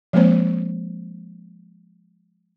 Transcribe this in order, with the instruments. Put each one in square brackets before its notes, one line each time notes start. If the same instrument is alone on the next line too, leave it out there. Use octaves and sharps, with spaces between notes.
[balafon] F3 G#3 A#3 C4 C5 C#5